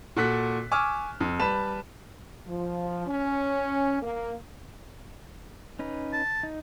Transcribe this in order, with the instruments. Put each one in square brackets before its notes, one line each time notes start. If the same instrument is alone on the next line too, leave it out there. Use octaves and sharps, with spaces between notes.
[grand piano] A#2 F#4 A4 F#6 B6
G#5 C#6 D6 E6 F6
F2
G3 B4 A5 B5 E7
[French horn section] F3
C#4
A#3
[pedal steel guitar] C#4 D#4 B4
[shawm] A5
[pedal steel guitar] D#4